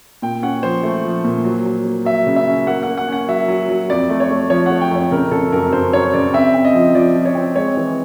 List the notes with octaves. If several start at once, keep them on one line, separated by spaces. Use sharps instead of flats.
A#2 G5
C#4 F#5
F3 C5
A3
F3
A#2
F#3
F#3
A#3
F#3 E5
C#3
E5
C#4
A#3 F#5
A#3 F#5
F#5
C#4 F#5
F#3 E5
F#3
F#3
F2 D5
A3
C#5
A3
F3 C#5
A3 F#5
G5
F2 C#5
C#3 A#4
C#3 A4
F#2 A#4
F#2 C5
F#2 C#5
C#3 D5
C4 E5
C4
D#5
F3
F3 D5
F3
C#5
C4
G#3 C#5
E3